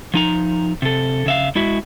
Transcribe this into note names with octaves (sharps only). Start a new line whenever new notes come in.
F3 D#4 A#5
C3 A4
C#3 E5 F5
G#3 E4 F#4 E5